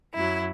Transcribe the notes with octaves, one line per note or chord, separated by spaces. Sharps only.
F#2 F#3 E4